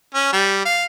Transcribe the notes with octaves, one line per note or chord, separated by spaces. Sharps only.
C#4
G3
F5